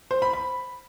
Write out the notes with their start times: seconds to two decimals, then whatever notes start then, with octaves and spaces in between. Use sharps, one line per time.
0.11 C5
0.22 B5
0.33 B5